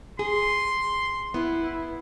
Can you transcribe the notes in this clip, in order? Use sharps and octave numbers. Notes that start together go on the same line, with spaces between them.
G#4 C6
B3 E4